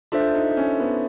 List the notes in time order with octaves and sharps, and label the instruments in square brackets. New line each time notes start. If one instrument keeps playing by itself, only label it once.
[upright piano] D4 [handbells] F4 A4 C5 E5
[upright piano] D#4
C#4
B3